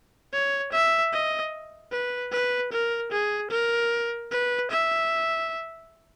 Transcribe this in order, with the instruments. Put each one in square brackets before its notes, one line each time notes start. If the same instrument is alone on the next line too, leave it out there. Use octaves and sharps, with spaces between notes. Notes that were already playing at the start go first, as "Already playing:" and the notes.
[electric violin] C#5
E5
D#5
B4
B4
A#4
G#4
A#4
B4
E5